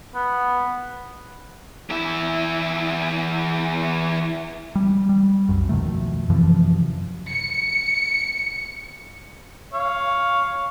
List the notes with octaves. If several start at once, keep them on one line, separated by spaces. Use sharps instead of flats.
B3
E2 E4
G3
G3
C2 F#2
F2 B2 D#3 A3
F#2 C3 E3 F3
C#7
C#5 F5